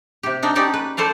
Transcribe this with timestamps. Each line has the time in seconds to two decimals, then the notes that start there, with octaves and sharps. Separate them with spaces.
0.23 C3 G4
0.43 C4 D4 D#4
0.55 C#4 D#4 G4 D5
0.74 B4
0.97 A4 C5 D5 F5